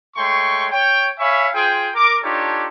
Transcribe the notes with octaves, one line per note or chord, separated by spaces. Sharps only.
G#3 A3 C#5 G5 C6 C#6
C#5 G5
C#5 E5 F5 G#5 B5 C#6
F4 G#4 C5 G5
A#4 D6
D4 D#4 F4 G4 A4 C#5